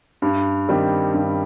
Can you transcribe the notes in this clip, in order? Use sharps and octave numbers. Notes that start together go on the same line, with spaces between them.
G2
D#3 G3 C4
G2